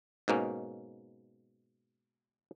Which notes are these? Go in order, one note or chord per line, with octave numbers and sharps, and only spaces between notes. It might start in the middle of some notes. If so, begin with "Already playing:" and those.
G#2 B2 A#3 C#4